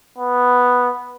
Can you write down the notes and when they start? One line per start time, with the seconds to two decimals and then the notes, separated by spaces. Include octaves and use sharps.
0.18 B3